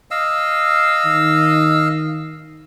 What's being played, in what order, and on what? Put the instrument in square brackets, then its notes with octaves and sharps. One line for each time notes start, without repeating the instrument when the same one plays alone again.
[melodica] D#5 F5 E6
[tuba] D#3